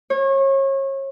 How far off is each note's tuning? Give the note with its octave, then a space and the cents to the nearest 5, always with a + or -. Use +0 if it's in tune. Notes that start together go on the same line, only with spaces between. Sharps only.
C#5 -30